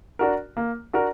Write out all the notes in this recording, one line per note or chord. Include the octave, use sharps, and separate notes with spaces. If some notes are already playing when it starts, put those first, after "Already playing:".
D4 F#4 A#4
A#3
D4 F#4 A#4